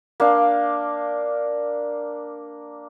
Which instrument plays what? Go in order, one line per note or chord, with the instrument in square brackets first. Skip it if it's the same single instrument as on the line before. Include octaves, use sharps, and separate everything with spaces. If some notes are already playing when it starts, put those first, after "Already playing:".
[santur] A#3 D4 F5